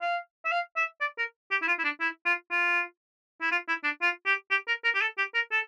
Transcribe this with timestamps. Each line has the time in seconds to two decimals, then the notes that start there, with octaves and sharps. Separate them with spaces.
0.02 F5
0.45 E5
0.52 F5
0.77 E5
1.01 D5
1.18 A#4
1.51 G4
1.62 E4
1.67 F4
1.79 E4
1.84 D4
2.01 E4
2.26 F4
2.51 F4
3.41 E4
3.52 F4
3.68 E4
3.84 D4
4.02 F4
4.26 G4
4.51 G4
4.68 A#4
4.84 A#4
4.95 G4
5.01 A4
5.18 G4
5.35 A#4
5.52 A4